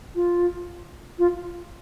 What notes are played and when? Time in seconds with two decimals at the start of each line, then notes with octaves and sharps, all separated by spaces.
0.15 F4
1.19 F4